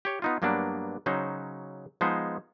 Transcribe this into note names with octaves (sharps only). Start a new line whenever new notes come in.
G4 C#5
B3 D#4 F4
G2 F#3 A#3 B3 D4
C#3 F#3 C#4 D#4 C5
F3 G#3 B3 D#4 G#4 C5